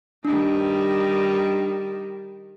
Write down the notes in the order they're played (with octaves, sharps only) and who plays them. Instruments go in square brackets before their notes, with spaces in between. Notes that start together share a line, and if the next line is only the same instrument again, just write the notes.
[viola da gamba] D#3 G3 D#4 [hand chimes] D4